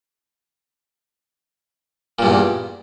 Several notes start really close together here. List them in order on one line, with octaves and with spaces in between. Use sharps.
A#2 G2 E2